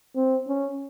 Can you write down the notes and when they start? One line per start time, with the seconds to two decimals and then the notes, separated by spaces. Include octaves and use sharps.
0.15 C4
0.48 C#4